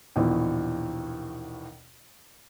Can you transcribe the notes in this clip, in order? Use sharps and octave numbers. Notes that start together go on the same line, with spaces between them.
A#1 D#2 B2 E3